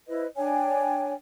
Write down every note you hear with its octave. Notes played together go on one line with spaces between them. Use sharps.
E4 B4 C5 D#5
D4 C#5 G5 G#5